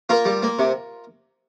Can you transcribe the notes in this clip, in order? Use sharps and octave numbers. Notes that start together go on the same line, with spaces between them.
A#3 F4 A#4
G3
A#3
C3